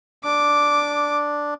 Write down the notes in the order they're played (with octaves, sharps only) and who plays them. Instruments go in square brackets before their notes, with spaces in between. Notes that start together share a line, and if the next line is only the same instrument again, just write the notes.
[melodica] D4 [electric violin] D6